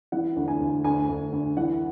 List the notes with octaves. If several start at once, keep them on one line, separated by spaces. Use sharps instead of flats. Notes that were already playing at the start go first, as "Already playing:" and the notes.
E3 F#5
D2
G#5
D2
D2 G#5
D2
D2
E3 F#5